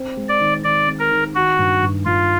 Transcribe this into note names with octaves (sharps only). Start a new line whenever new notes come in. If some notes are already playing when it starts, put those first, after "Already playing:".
Already playing: C4
G#3
D5
D#3
D#3 D5
C4
A#4
D#3
D#3 F#4
G2
G2
G2 F4